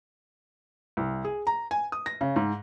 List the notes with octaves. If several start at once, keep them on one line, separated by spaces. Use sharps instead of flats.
C2
G#4
A#5
G#5
D#6
A#6
C#3
G#2